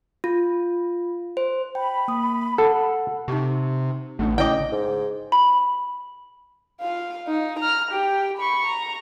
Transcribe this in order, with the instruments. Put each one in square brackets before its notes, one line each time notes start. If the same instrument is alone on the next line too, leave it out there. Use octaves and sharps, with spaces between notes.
[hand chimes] F4
C5
[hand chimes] G5 [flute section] B5
[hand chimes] A#3 D#6
[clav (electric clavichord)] A4 [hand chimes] F#5
[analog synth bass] C3 [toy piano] D#4 G4
[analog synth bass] A1 [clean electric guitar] A3 D4 F#5
[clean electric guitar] C#3 C#4 [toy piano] E4 C#5 D6 [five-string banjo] D#5 G5
[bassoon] G#2
[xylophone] B5
[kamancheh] F4 F5
D#4
A#5 F6
G4 G5
B5 C#6
A#5